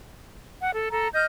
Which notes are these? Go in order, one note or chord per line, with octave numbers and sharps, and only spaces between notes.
F#5
A4
A4 A#5
D#5 F6 G6